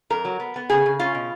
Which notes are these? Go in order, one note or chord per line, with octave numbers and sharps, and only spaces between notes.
F2 A#4
F#3
B3
B3
C#3 G#4
C#3
C#4 F4
B2